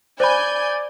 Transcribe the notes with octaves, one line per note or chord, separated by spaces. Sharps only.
C5 D5 G#5 B5 G6